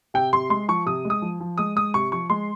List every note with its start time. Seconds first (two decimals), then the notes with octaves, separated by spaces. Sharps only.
0.14 C3 G5
0.33 C3 C6
0.50 G#3 C6
0.68 F3 C#6
0.86 C3 D#6
1.05 G#3
1.10 D#6
1.22 F3
1.40 F3
1.58 G#3 D#6
1.76 G#3 D#6
1.94 C3 C#6
2.12 F3 C#6
2.30 G#3 C6